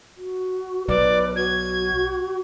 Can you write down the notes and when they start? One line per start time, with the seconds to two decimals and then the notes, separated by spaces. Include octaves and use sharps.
0.16 F#4
0.89 B1 B4 D5
1.36 F#4 G#6